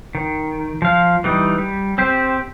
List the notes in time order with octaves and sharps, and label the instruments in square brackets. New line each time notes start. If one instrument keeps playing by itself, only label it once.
[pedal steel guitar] D#3
F3 F5
E3 G3 D#4
G3
C4 G4 C5